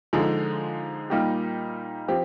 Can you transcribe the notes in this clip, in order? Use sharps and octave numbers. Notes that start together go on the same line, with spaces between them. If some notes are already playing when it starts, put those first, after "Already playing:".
D3 F3 G#3 D#4 G#4
A#2 G3 A#3 D#4 G4
F3 C4 G4